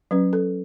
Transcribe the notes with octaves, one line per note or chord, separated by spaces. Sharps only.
F#3 C#4 B4
A4